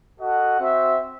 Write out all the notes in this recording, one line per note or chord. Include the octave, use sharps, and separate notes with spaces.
F#4 A4 D#5 F#5
C4 F#4 C5 E5